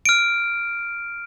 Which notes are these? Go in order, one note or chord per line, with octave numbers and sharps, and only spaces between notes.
F6 D7